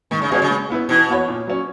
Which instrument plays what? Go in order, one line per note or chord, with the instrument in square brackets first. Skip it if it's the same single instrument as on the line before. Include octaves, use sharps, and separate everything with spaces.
[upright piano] G#2 [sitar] D#3
[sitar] C#3
[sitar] B2 [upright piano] F#3 C#4 G#4 D#5
[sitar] C#3
[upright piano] G#3
B3 E4 B4
[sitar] B2 [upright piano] E3
[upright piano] B3 F#4 C#5
A#2
F#3 C#4